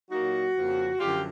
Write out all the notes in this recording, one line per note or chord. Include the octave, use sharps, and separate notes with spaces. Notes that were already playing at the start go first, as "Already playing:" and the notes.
A#2 F#3 A#3 D#4 F#4
F2 C#3 F3 A#3
F#2 D3 F3 F4 G4